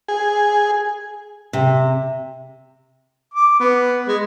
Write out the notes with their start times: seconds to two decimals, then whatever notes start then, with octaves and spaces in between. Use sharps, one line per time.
0.08 G#4
1.53 C3
3.33 D6
3.60 B3
4.08 G#3